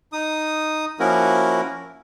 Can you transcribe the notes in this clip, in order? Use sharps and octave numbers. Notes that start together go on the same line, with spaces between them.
D#4 D#6
F3 A#3 C#4 E4 F#4 A#4